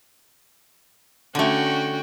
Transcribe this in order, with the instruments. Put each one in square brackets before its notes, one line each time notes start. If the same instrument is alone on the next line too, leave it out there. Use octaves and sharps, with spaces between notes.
[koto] D3 A3 [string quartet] C#4 F#4 G5